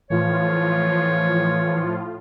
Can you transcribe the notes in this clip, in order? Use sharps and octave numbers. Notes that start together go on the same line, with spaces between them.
A2 E3 F3 F4 C#5